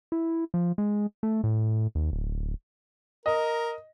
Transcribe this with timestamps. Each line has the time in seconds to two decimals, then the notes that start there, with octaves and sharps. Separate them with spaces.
0.12 E4
0.54 F3
0.78 G#3
1.23 A3
1.44 A2
1.95 D#2
2.12 D1
3.26 A#4 D#5